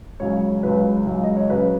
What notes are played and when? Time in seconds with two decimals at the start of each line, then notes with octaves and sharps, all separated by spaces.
0.20 C#2 C#3 F#3 C#5
0.63 C#2 C#3 F#3 B4
1.06 C#2 C#3 F#3
1.24 D#5
1.37 C#5
1.50 C#3 F#3 B4